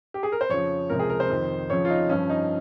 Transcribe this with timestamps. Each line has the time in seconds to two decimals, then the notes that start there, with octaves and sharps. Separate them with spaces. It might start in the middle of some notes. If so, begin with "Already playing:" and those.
0.14 G4
0.23 G#4
0.32 A#4
0.41 C5
0.50 F2 C#3 F3 C#5
0.90 C#2 C3 F3 A#4
0.99 G#4
1.10 A#4
1.20 C5
1.30 F2 D#3
1.70 F2 C#3 F3 C#5
1.85 F4
1.90 D#4
2.10 G2 F3 C#4
2.30 D#4